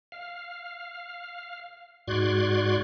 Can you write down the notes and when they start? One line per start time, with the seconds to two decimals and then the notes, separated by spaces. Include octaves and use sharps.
0.12 F5
2.07 G#2 F#4 D5 C6 F#6 G#6